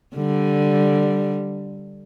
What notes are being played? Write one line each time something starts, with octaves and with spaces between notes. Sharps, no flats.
D3 G3